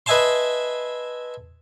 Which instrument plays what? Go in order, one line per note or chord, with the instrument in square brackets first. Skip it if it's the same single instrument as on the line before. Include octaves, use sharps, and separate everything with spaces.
[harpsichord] B4 D#5 E5 G#5 A5 C6